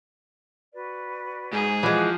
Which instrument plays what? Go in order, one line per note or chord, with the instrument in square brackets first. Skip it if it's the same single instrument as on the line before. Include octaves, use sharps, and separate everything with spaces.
[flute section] F#4 B4 D5
[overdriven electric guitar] G#2 [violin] G#4
[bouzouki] E3 G#3 [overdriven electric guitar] F3 [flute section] C5 F#5 F#6